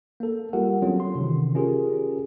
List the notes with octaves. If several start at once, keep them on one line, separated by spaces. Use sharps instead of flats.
A#3 A4
G3 F4 G4 A4 A#4 F#5
F#3 A#3 C4 C#4 F4
C6
C3 D#3 E3
C#4 F4 G4 G#4 A#4